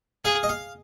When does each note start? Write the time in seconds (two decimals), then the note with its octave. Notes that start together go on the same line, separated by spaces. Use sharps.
0.25 G#4 F5
0.43 D#5
0.49 F5